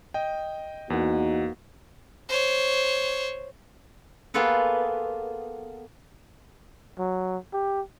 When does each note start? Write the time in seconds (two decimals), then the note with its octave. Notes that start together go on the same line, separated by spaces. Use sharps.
0.14 D#5 G5
0.90 E2 A#3 D#4 F#4 F#5
2.29 C5 C#5
4.34 A#3 B3 F4 G#4 A4 B4
6.99 F#3
7.53 G4